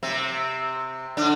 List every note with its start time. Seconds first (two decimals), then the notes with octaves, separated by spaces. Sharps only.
0.03 C3 C4
1.17 D3 D4